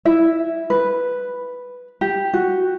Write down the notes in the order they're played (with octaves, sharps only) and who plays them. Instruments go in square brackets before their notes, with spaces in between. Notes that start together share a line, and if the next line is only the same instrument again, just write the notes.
[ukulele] E4 E5
B4
G4
F#4